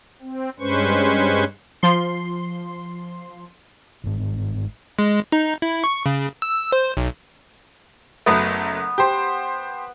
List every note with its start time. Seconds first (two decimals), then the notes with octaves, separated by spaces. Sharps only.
0.22 C4
0.60 G2 G#3 C#4 B4 C5 C#6
1.83 F3 C6
4.04 G1 G#2
4.99 G#3
5.32 D#4
5.62 E4
5.84 C#6
6.06 C#3
6.42 E6
6.72 C5
6.97 B1
8.26 F#1 F#3 A3 B3
8.98 G4 C5